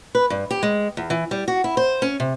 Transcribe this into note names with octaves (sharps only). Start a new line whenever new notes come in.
B4
G2
G4
G#3
E2
E3
G3
F#4
E4
C5
C#4
C3